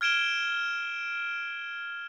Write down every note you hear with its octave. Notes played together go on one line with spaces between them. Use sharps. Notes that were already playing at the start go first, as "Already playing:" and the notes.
F6 G#6 D7 E7 G7